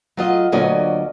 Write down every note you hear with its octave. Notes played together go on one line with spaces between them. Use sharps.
F#3 F4 D#5
D2 A#2 F#3 C#4 D5 D#5